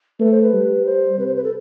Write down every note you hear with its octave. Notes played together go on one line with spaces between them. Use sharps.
A3 B4
C5
B4
G3
C5
C3 B4
C5
B4
A4